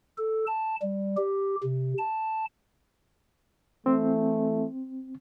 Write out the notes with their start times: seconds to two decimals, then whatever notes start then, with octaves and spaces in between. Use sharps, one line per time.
0.18 A4
0.47 A5
0.82 G3
1.17 G4
1.63 C3
1.98 A5
3.86 E3 A3 C4